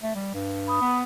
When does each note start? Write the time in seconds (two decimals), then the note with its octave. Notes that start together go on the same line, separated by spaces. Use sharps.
0.03 A3
0.15 G3
0.34 G2
0.68 B5 D#6
0.81 B3